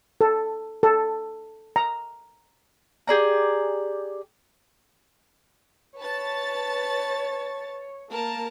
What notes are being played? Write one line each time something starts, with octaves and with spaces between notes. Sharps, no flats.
A4
A4
A#5
G4 G#4 D5 A#5
B4 C#5 A5 A6
A#3 A#4 A5